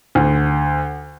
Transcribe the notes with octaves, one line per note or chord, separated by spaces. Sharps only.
D2